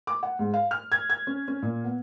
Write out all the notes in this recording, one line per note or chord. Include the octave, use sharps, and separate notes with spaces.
D6
F#5
G#2
F5
F6
G#6
G#6
C#4
C#4
A#2
B3